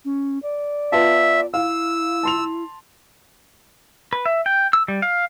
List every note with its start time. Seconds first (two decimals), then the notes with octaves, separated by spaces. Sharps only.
0.05 C#4
0.43 D5
0.92 B3 F4 E5 A5
1.54 E4 F5 E6
2.23 A5 C6 F7
4.13 B4
4.26 E5
4.46 G5
4.73 E6
4.88 G3
5.02 F5